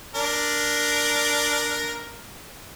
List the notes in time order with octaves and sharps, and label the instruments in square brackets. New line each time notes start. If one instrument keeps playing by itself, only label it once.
[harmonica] D4 A#4